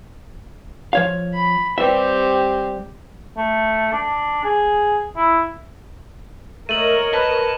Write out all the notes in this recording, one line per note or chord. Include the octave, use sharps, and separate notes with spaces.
F3 C#5 F5
B5
G3 C4 G4 B4 E5
A3
D4
G#4
E4
A3 A#4 C#5 D#5 D#7 F#7
B4 A5